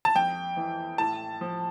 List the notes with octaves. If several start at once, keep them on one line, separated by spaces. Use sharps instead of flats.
A5
F2 G5
E3
A2 A5
F3